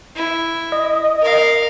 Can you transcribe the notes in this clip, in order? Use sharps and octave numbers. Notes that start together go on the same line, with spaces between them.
E4
D#5
A#4 F5